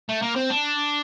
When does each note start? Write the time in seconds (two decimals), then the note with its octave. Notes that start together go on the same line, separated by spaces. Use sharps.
0.09 A3
0.22 A#3
0.36 C4
0.50 D4